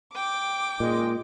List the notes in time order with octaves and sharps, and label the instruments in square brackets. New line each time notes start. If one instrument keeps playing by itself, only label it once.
[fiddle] G5 [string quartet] D6
[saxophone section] F#2 D#3 G#3 [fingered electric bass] A#2